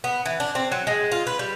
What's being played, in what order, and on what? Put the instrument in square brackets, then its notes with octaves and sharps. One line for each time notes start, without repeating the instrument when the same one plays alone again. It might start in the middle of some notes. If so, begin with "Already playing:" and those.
[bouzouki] B3
E3
D4
C4
F#3
G#3
F4
B4
G3